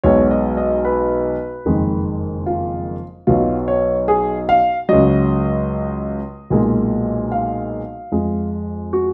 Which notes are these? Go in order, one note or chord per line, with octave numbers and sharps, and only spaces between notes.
B1 B2 G#3 C#5
D#5
D#5
B4
F#1 F2 D#3 G#3
F4
B1 B2 F#3 F4
C#5
G#4
F5
C#2 C#3 F#3 D#5
B1 A#2 G#3
F5
F2 F3 G#3
F#4